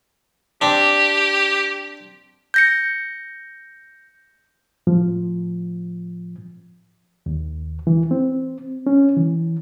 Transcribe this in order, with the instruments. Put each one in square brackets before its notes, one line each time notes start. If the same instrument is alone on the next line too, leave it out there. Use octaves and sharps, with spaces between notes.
[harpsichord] C4 D4 [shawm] G4
[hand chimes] G6 A#6 C#7
[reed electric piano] A2 F3
D#2
E3
C4
C#4
E3